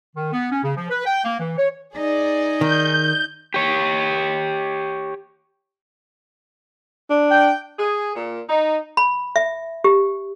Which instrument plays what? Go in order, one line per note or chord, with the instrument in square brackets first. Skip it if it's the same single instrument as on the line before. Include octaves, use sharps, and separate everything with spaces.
[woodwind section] D#3
B3
C#4
C#3
F3
B4
G5
A#3
E3
C#5
[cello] D#4 [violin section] G#4 D5
[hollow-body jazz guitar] D#3 [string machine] G6
[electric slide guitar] G4 C#5
[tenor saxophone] D4
[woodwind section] G5
[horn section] G#4
A#2
D#4
[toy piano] B5
E5
G4